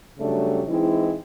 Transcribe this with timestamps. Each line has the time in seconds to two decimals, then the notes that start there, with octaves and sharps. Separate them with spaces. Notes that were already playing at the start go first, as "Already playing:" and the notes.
0.19 C#3 F#3 G3 A3 D4
0.67 E3 G#3 C4 D#4 E4